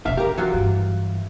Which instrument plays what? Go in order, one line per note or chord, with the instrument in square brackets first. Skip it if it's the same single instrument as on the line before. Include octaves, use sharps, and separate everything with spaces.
[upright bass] D#2 C3 [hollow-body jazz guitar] E5 F5
[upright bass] D3 [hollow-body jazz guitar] G4 A#4
[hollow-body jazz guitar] E3 F#3 F4
[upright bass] G2